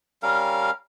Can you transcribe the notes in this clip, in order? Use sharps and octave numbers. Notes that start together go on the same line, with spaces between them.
G3 C#4 A#4 F5